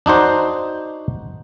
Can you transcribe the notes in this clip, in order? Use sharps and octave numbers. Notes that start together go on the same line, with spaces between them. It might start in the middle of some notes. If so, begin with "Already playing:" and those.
D4 D#4 F#4 C5